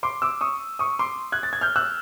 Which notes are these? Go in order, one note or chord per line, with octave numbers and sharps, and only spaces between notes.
C6 D6
D6 E6
C#6 D#6
C#6 D#6
C6 D6
F#6 G#6
A6
G#6
F6 G6
E6 F#6